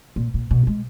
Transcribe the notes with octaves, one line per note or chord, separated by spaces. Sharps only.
A#2
A#2
B2
G#3